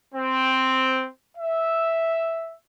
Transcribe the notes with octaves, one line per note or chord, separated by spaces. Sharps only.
C4
E5